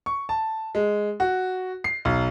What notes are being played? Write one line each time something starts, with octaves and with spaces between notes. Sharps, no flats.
C#6
A5
G#3
F#4
C7
B1